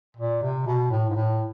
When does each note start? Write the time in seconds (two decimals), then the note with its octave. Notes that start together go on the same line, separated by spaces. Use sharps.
0.17 A#2
0.42 C3
0.66 B2
0.90 A2
1.10 G#2
1.16 A2